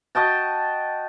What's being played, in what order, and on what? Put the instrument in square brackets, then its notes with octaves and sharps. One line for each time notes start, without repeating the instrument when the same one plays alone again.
[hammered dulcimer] F#4 D#5 G5 A5